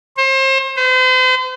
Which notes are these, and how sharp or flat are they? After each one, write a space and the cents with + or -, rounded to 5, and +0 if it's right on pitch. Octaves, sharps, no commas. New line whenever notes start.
C5 +35
C5 -40